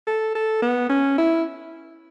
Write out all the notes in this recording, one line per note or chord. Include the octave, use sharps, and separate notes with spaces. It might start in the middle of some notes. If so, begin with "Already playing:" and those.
A4
A4
B3
C#4
E4